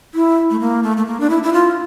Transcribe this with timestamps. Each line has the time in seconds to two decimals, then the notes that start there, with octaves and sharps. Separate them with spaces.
0.14 E4
0.50 A3
0.60 A#3
0.83 A3
0.97 A3
1.06 A#3
1.20 D4
1.30 E4
1.43 E4
1.53 F4